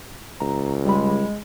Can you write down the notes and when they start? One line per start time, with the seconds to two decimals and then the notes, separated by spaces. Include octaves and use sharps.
0.40 C#2 A#5
0.85 G3 G#3 B5